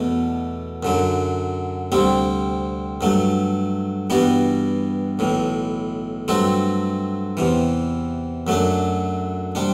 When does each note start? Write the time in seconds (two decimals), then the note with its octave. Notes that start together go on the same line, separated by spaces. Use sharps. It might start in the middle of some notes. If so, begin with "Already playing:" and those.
Already playing: E2 B2 A3
0.83 F#2 D3 F#3
1.92 D2 C3 G3 C4
3.01 G2 F#3 A3
4.10 G2 E3 G3 B3 F#4
5.19 B1 A2 E3
6.28 G2 F#3 A3 C4 F#4
7.37 E2 C3 E3
8.47 F#2 F#3 A3 D4
9.55 C3 G3 D4